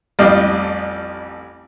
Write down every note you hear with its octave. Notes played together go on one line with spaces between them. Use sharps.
A1 F2 G3 D5 D#5 F5